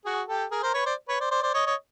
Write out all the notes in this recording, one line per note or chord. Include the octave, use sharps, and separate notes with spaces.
F#4 G#4
G4 A4
G#4 A#4
A#4 C5
B4 C#5
C5 D5
B4 C#5
C5 D5
C5 D5
C5 D5
C#5 D#5
C#5 D#5